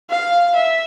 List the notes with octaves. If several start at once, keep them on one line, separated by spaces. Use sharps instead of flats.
F5
E5